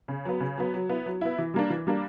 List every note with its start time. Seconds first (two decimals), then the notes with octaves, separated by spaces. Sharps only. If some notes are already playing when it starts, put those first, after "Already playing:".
0.08 C#3
0.25 F#3 B3
0.40 C#3
0.58 F#3 B3
0.74 F#3
0.89 B3 E4
1.06 F#3
1.21 B3 E4
1.38 E3
1.54 G3 A#3 D4
1.70 E3
1.87 G3 A#3 D4